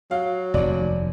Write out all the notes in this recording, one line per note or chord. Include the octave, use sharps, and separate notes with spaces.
F#3 F5
F1 D#2 D5